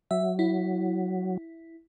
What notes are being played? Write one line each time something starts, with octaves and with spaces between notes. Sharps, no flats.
F#3 E5
E4